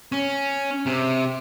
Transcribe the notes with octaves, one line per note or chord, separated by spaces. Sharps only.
C#4
C3